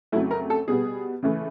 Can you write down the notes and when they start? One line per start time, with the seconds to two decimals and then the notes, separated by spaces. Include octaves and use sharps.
0.12 F2 C#3 F#3 A3 E4
0.31 A#4
0.50 A4
0.68 B2 G3 B3 G#4
1.23 C#3 E3 A3